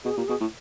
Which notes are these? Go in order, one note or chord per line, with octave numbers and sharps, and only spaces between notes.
B2 G#4
A#2 G4
B2 G#4
A2